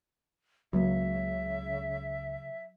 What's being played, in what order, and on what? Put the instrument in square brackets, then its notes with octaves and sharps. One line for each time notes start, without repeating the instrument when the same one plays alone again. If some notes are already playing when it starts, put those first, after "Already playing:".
[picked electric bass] C#2 [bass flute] C#3 [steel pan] F#3 A#3 [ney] E5